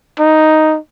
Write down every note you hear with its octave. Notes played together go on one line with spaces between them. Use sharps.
D#4